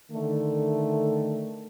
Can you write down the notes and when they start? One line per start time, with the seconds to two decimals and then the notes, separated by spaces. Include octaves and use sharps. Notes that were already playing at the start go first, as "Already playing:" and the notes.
0.11 D3 D#3 A3